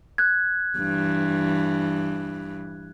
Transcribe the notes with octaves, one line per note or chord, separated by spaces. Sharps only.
F#6 G#6
G2 E3